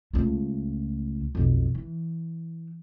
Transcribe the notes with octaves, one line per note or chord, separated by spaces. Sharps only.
C#2 A3
B1 F2
E3